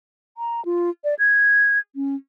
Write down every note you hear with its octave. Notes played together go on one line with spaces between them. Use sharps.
A#5
F4
D5
G#6
C#4